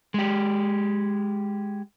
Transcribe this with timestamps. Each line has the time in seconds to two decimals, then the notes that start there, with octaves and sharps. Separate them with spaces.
0.14 G#3 G4